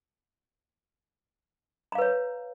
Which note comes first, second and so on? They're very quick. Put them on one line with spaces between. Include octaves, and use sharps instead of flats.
A#5 F5 B4 C#5